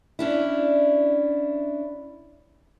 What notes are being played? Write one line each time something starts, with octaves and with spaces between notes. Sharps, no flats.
C#4 D4 E4